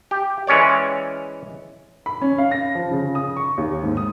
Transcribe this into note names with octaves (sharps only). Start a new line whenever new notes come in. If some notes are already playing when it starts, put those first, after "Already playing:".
G4
E3 G#3 C#4 C#5 D5
B5
C#4
F5
A#6
F3
C#3
D#6
C#6
D#2
G#2
D#6